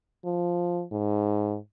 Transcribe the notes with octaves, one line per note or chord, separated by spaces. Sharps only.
F3
G#2